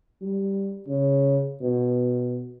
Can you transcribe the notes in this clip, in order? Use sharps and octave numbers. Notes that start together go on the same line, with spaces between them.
G3
C#3
B2